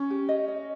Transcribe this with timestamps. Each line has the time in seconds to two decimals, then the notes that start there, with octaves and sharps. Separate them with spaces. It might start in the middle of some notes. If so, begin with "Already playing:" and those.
Already playing: C#4
0.10 G4
0.29 D#5
0.48 D#5